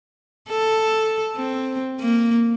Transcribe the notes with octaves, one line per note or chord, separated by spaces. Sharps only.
A4
C4
A#3